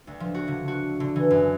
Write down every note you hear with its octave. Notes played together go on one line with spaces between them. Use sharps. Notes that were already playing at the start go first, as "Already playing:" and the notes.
D2
F3
F#4
D3
F#4
D3
E3
F#2